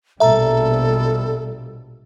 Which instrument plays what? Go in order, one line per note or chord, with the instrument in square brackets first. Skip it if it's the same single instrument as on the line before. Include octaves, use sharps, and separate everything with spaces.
[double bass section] A#1 B2 G3 [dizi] A4 [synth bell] E5 A#5